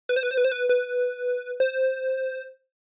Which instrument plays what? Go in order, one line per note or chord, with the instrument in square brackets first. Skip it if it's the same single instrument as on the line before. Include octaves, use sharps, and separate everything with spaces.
[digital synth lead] B4
C5
B4
C5
B4
C5
B4
B4
C5